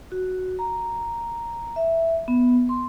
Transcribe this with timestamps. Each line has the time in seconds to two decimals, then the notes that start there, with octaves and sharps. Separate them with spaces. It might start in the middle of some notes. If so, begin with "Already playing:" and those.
0.12 F#4
0.59 A#5
1.76 E5
2.28 B3
2.69 C6